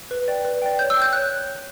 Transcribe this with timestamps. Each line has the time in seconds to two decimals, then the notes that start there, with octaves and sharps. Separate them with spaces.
0.11 B4
0.28 D5 G5
0.45 B4
0.62 D5 G5
0.79 C#5 G6
0.90 E6
0.96 G5
1.02 G6
1.13 C#5 F#6